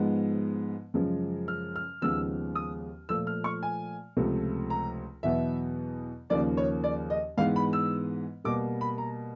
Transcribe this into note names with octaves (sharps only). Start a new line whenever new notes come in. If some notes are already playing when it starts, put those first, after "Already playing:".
Already playing: G#2 F3 G#3 B3
F#2 C#3 F3 G#3
F6
F6
D#2 C#3 F3 G#3 B3 E6
D#6
A#2 F3 A3 E6
F6
C#6
G#5
C#2 C3 F3 A3
A#5
E2 B2 F#3 B3 E5
D#2 C#3 F3 A#3 D5
C#5
D5
D#5
G#2 E3 G#3 B3 F5
B5
E6
B2 G3 A#3 D6
B5
A#5